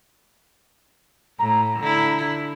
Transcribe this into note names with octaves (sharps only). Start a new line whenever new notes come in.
A2 A#5
D3 E4